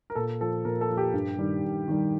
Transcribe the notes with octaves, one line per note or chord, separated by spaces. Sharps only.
A#4
A#2 A4
F3 A4
A#2 A#4
A4
F3
G4
G2
D#3 G3
G2
D#3 G3